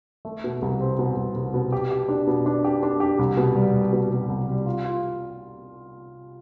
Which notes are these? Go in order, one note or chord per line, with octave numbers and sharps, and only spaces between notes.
A3
B2
C2
C4
B2
C2
C2
B2
G4
G4
D4
B2
D4
G4
D4
G4
C2
B2
G3
C2
B2
B2
C2
G3
F4
F4